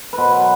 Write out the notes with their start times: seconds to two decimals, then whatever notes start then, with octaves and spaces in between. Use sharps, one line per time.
0.13 B2 B4 C5
0.33 F#3